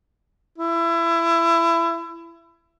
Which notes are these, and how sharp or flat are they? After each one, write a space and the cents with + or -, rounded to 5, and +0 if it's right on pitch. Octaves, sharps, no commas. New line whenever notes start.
E4 +25